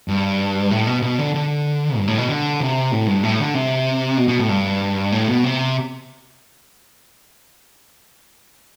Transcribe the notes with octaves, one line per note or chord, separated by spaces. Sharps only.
G2
A2
B2
B2
D3
D3
G2
A2
B2
D3
C3
A2
G2
A2
D3
C3
B2
B2
A2
G2
A2
B2
C3